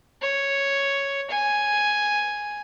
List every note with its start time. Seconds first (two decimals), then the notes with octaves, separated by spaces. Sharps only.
0.22 C#5
1.30 G#5